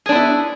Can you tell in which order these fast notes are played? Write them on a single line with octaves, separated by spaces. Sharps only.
G#4 D4 B3 E4